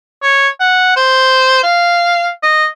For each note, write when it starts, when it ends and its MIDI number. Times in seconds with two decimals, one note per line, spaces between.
0.22 0.48 73
0.60 0.95 78
0.96 1.62 72
1.63 2.29 77
2.43 2.67 75